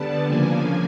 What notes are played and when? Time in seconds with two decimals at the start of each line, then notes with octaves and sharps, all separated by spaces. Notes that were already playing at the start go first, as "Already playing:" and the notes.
Already playing: D3 G3 B3 D4 A5
0.25 C#3 F3 A#3 D4 G#5